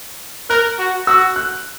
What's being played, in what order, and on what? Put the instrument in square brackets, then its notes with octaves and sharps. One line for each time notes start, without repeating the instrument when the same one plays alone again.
[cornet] A#4 [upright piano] F#6
[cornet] F#4
[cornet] F#4 [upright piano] E6
[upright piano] F#6